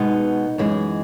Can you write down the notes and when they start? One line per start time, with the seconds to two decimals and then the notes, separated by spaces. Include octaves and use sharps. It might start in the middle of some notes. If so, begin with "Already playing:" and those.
Already playing: B2 G#3 B3 D#4
0.58 F#2 E3 G#3